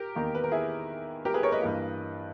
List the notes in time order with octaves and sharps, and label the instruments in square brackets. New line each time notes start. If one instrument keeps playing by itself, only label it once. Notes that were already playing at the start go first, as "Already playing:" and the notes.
Already playing: [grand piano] G4 A#4
E2 D#3 A#3
B4
A#4
E4 G#4
G4 A#4
G#4 B4
A#4 C#5
B4 D#5
G2 E3 A#3